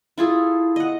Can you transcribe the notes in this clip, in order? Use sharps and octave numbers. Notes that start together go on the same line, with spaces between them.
E4 F4 G#4 A4
D#5 F#5